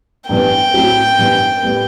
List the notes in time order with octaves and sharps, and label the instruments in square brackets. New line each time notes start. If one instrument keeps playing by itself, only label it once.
[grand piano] G2 E3 B3 [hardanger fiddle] G5
[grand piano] A2 F#3 C4 E4
G2 E3 B3
A2 G3 B3